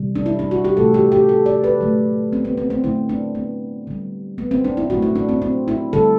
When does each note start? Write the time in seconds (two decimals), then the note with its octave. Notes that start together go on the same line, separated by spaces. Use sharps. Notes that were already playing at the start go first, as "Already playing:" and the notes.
Already playing: C3 E3 G3
0.16 D4
0.26 E4
0.39 D4
0.51 F#4
0.65 G4
0.77 C3 E3 A3 A4
0.94 G4
1.12 G4
1.29 A4
1.46 D5
1.64 B4
1.80 D3 F#3 A3
2.33 C4
2.45 B3
2.58 C4
2.70 C4
2.84 D3 F#3 A3 E4
3.09 D4
3.35 B3
3.87 D3 G3
4.38 B3
4.51 C4
4.65 D4
4.77 E4
4.90 B2 F#3 A3 F#4
5.02 E4
5.16 D4
5.29 C4
5.42 C4
5.68 E4
5.93 D3 G3 A4